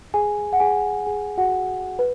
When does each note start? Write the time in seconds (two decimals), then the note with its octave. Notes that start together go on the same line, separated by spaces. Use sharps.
0.14 G#4 G#5
0.53 F#5
0.60 G#4 G#5
1.06 G#4 G#5
1.38 F#4 F#5
1.99 B4